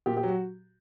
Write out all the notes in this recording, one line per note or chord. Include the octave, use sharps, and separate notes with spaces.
A#2 G4
G4
F#3 F#4